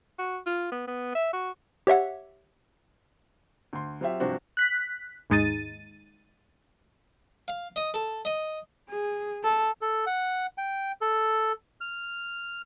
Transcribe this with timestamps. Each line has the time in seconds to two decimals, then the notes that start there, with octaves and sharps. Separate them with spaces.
0.19 F#4
0.46 F4
0.72 B3
0.87 B3
1.15 E5
1.33 F#4
1.87 G4 C#5 E5 F#5
3.73 D2 C6
4.01 F#3 C4 F4 G4 E5
4.20 G2 C3 F3 C4 D4 F#4
4.57 F#6 B6
5.30 D#2 G#2 G#3 D#4 A6 D#7
7.48 F5
7.76 D#5
7.94 A4
8.25 D#5
8.90 G#4
9.44 A4
9.81 A4
10.06 F#5
10.58 G5
11.01 A4
11.81 F6